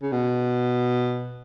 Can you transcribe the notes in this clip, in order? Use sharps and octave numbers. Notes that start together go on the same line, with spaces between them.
C#3
B2